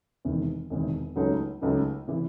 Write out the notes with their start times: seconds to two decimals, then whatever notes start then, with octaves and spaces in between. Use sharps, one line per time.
0.25 E1 E2 C3 D#3
0.70 E1 E2 C3 D#3
1.16 C#2 C#3 F#3 A3 D#4
1.61 C#2 C#3 F#3 A3 D#4
2.08 C3 E3